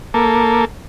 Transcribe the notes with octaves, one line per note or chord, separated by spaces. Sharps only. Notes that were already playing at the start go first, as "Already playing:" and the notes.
A#3 A4